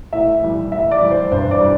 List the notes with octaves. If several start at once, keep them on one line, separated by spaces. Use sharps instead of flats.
A2 E5
E3 G3
A2 E5
D5
E3 G3
C5
G2 C5
D5
G3